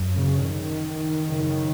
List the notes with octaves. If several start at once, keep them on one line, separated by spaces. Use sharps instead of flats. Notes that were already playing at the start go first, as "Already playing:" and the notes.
Already playing: F#2
C#3
D#3
F#2 C#3